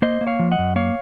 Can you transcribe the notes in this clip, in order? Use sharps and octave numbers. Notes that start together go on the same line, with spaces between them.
A#3 C5 D#5
A#3
C#5 F5
F3
D#5 F#5
F#2
A#3 C#5 F5